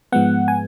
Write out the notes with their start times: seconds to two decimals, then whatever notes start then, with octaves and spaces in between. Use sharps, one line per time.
0.12 G#2 F3 G#3 B3 F#5
0.48 G#5